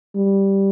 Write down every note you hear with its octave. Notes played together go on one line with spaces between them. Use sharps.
G3